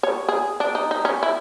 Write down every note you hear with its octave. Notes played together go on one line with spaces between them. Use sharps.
C#5
G#4
D4
D#4
D#4
C#4
E4